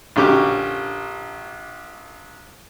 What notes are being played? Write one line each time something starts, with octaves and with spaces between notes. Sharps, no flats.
A#1 D3 C#4 G4 D6